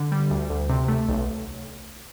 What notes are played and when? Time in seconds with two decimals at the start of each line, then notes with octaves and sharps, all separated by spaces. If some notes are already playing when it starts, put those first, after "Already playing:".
Already playing: D3
0.12 G3
0.30 D2
0.50 D2
0.70 C3
0.88 A3
1.08 B1